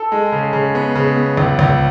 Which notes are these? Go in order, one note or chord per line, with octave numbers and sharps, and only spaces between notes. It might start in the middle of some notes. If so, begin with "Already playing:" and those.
Already playing: A4
G#3
C#3
C#3
B3
C#3
B3
C#2
C#2